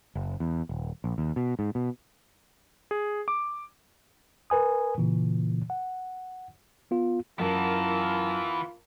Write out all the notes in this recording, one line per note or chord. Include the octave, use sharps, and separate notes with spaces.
F#1
E2
D#1
A#1
D#2
B2
G#2
B2
G#4
D6
A#4 B4 G#5 D#6
A#2 C#3 E3
F#5
B3 F4
F#2 E3 B3 F4 A#4 A5